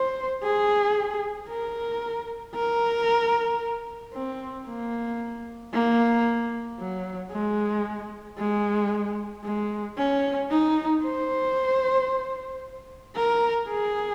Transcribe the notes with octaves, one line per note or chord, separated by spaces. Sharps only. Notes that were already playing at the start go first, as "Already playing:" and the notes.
Already playing: C5
G#4
A#4
A#4
C4
A#3
A#3
F#3
G#3
G#3
G#3
C#4
D#4
C5
A#4
G#4